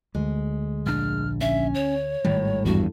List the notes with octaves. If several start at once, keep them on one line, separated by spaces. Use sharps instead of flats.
D2 G#3
A#1 D4 F6
C#4 E5
C#5
G#1 A2 D#3 G3
E2 G2 F#4